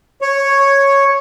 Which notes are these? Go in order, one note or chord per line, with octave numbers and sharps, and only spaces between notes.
C#5